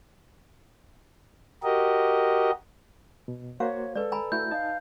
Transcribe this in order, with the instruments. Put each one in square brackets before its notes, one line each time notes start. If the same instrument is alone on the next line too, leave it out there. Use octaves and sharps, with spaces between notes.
[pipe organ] F#4 G4 A#4 D#5
[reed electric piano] B2
[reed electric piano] A#3 F#4 C5 [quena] C#5 [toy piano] F5
[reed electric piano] G#3 [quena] A4 [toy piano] B4 D5
[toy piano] G#5 A#5 B5
[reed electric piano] A3 E4 F#4 [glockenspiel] G6
[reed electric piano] D#4 A5 [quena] F5